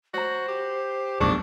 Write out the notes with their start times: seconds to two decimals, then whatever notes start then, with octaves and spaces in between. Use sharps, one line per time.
0.14 F#4 C5 C#5 A#5
0.48 G4
1.20 B1 F2 A#2 D4 G#4 C#6 D6